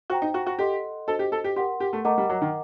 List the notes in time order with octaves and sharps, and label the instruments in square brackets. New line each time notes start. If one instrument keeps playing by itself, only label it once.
[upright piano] F#4 [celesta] C5 G5 A#5
[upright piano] D#4
F#4
F#4
[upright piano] G4 [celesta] A4 D#5 F#5 C6
[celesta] D4 F#4 C5 D#5 [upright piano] A4
[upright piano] G4
A4
G4
[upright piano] G4 [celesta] A#4 F#5 C6
[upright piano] G4
A3
[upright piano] A3 [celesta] A#4 D#5 F#5 A#5 D6
[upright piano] G3
F#3
D#3